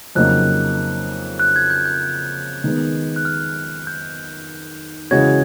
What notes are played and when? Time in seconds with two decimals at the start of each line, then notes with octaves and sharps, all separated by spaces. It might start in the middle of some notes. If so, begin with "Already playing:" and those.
0.15 F2 C#3 F#3 A#3 D#4 F#6
1.39 F#6
1.56 G#6
1.70 G6
1.86 G6
2.64 D#3 G#3 B3
3.16 F#6
3.25 F6
3.87 G6
5.11 C#3 E3 G#3 C#4 F#4 G#6